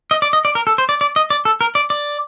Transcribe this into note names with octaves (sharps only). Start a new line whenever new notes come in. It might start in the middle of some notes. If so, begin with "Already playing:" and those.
D#5
D5
D#5
D5
A#4
A4
C5
D5
D5
D#5
D5
A4
A#4
D5
D5